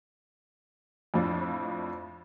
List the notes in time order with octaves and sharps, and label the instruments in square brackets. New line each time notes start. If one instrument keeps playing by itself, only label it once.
[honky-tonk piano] F2 A2 F3 D4